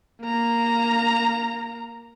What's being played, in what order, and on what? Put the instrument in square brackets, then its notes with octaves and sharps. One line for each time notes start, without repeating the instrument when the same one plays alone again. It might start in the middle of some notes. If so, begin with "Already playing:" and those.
[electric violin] A#3 A#5